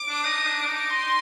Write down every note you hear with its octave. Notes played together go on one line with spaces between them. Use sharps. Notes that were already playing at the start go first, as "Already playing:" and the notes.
Already playing: D6
D4
D#4 D#6
D4
D6
D4
D#4
D#4 C6